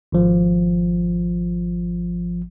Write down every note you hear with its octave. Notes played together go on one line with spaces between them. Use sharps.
G#1 F3